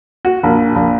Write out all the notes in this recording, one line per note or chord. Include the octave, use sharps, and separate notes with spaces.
F#4
A#1
A#1